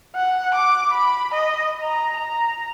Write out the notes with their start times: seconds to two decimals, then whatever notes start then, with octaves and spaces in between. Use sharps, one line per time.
0.16 F#5
0.55 D6
0.92 B5
1.34 D#5
1.83 A#5
2.16 A#5